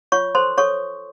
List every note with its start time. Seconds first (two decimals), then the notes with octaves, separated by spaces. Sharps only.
0.12 F4 C#5 C#6
0.35 A4 C5 C6
0.58 A4 C#5 C#6